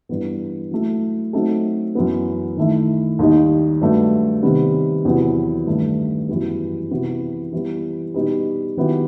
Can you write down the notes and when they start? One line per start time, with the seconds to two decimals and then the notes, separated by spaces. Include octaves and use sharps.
0.09 G2 E3 B3
0.71 F#3 A3 E4
1.33 F#3 A3 C4 D#4 A4
1.95 F#2 E3 B3
2.57 D#3 A3 E4
3.19 D#2 D#3 G3 D#4
3.81 G2 F#3 A3
4.43 C3 D#3 G3 B3
5.05 E2 C3 F#3 B3
5.67 G2 D#3 A3
6.29 F#2 E3 G3 B3
6.91 C3 E3 B3 F#4
7.53 E3 G3 B3
8.14 B2 G3 D#4 G4 B4
8.77 D#3 F#3 B3 E4 G4